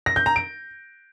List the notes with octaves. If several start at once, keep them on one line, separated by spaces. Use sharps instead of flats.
A#6
G6
A#5
D7